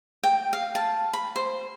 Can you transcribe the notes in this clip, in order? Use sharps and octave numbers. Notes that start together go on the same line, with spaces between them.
G5
F5
A5
B5
C5